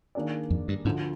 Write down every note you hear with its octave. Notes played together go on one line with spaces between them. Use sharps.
D#3 A#3 D4 G#4 D5
F2
G2
D2 G#2 D3 F3